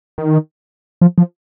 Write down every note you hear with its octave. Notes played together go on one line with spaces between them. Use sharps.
D#3
F3
F3